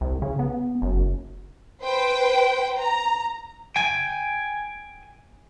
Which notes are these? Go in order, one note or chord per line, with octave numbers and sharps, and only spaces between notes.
C2
C#3
B3
F#1
B4 C5 G5
A#5
G5 G#5